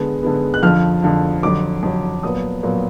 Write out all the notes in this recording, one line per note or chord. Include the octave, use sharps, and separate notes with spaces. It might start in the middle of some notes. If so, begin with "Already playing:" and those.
Already playing: D3 G#3 B3
D3 G#3 B3
F#6
F2 D3 F3 F6
F2 D3 F3
F2 D3 F#3 D6
F2 D3 F#3
A#2 F#3 B3 D#6
A#2 F#3 B3